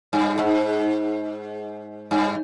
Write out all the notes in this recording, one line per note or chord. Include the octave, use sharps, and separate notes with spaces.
G2
G#2
G2